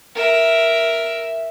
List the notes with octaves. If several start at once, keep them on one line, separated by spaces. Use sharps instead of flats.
A#4 E5